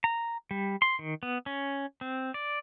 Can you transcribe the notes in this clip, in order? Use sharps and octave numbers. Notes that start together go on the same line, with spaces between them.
A#5
G3
C6
D#3
B3
C#4
C4
D5